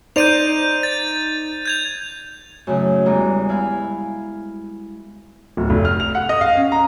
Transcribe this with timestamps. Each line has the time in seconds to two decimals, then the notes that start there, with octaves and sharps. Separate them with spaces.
0.16 D#4 C5 D5 G6 D#7 F7
0.83 A6
1.66 G6 G#6 F7
2.67 F#2 A2 C#3
3.06 E2 G3 G#3 A#5
3.49 E4 F5 G#5 B5
5.57 D1
5.70 F1
5.85 F6
6.00 F7
6.15 F#5
6.29 D#5
6.41 F5
6.57 C#4
6.72 A#5